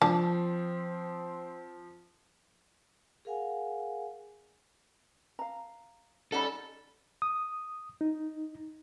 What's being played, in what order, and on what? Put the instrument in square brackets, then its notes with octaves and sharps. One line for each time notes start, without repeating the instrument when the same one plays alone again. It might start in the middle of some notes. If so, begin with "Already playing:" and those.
[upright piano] F3 [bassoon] C4 [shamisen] D4
[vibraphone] G#4 A#4 F5 F#5 G#5
[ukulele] F5 A#5
[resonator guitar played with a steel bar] G3 C#4 D#4 [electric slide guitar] A4 [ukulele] F#5 B5
[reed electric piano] D#6
D#4